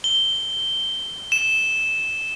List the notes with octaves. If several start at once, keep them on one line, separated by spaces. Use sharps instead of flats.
G7
E7